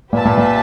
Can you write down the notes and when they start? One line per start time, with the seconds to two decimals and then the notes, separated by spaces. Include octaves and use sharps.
0.12 A#2 G4 B4 E5 A5
0.25 A#2
0.38 A#2